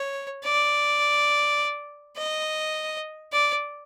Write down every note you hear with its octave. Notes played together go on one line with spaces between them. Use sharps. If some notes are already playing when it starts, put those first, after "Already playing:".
Already playing: C#5
D5
D#5
D5